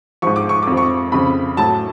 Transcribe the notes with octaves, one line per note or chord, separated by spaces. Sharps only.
G#2 F3 C#6
D6
C#6
F2 D6
F3
C#6
F2 C#3 F3 B5
A2 F#3 A5